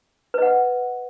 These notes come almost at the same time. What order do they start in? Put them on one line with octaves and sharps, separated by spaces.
B4 D#5 F#5